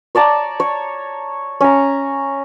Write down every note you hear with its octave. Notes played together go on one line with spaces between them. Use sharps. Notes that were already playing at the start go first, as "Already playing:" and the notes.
C#5 D5 A5 A#5
C#5
C#4 A#5